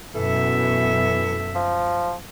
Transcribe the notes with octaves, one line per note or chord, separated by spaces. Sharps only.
F#2 B2 E3 A4 E5
F3